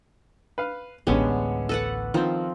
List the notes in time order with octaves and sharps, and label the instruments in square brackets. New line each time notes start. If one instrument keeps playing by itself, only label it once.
[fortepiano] B4 F5
[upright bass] A1 D2 [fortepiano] D3 C#4 G4 [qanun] G#3 B3
[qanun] A4 B4 F#5
[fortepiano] D#3 [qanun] F3 C4